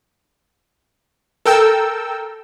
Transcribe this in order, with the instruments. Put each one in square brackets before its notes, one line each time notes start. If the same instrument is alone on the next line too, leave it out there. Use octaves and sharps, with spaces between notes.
[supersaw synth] A4 A#4 G5 E6